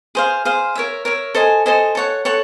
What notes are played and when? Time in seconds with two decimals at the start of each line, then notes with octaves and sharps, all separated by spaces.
0.15 G#4 C5 F5
0.45 G#4 C5 F5
0.75 A#4 C#5 E5
1.05 A#4 C#5 E5
1.35 A4 C5 D#5 G#5
1.66 A4 C5 D#5 G#5
1.95 A4 C#5 F#5
2.25 A4 C#5 F#5